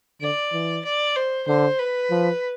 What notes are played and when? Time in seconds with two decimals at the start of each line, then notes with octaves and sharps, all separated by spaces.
0.21 D3 D5
0.53 E3
0.85 D5
1.16 C5
1.47 D3 C5
1.79 B4
2.11 F3